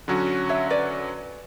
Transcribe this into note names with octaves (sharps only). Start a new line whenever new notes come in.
D3 F#3 C#4 F#4
C#5 E5
B4 D5